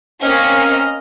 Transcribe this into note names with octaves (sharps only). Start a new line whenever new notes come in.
A#3 C4 C#4 D#5 F6